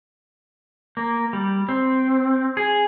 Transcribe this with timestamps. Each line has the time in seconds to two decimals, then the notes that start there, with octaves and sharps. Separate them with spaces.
0.97 A#3
1.33 G3
1.69 C4
2.57 G#4